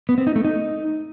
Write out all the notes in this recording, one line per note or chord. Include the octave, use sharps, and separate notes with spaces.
B3
C4
D#4
A3
D#4